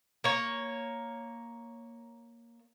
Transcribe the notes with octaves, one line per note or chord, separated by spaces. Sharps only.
A#3 C#5